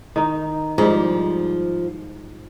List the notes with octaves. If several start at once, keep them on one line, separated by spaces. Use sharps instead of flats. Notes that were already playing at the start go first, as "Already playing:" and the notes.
D#3 D#4
G#2 F3 G3